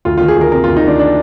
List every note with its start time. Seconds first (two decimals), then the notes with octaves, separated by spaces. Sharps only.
0.05 D2 F4
0.17 D#3 F4
0.28 G#4
0.36 D2 A#4
0.52 C3 A#4
0.64 D2 F4
0.77 D#4
0.84 D#3 D4
0.99 D4